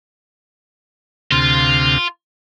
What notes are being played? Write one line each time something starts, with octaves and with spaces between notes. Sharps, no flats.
D2 C3 F4 F6